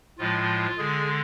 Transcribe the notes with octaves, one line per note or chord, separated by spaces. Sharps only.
A2 F3 G#3 F4
D3 G#3 G#4